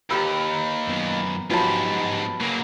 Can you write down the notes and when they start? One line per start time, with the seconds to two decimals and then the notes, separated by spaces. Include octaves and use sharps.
0.11 D#2 G4 A#4 B4 E6
0.88 F#2 B3
1.51 G#2 F3 F#3 B3 G4 B4 A5 B5
2.41 C#3 F#3 A#3